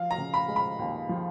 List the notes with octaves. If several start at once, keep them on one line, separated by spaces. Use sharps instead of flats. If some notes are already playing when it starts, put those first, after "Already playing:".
Already playing: F3 F5
A#5
C#3
B5
G#3
B5
D#2
F3